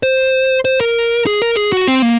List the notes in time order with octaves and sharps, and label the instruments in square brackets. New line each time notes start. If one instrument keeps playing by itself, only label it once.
[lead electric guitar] C5
C5
A#4
G#4
A#4
G#4
F#4
C4
A#3